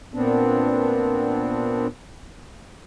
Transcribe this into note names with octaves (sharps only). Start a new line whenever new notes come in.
A#2 B3 C4 D4